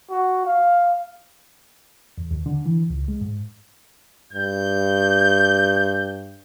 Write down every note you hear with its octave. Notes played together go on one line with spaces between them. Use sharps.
F#4
F5
E2
D#2
D3
E3
C#2
G#3
G#2
G2 G6